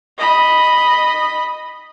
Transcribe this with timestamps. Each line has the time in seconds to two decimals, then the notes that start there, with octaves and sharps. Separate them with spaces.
0.18 D#5 B5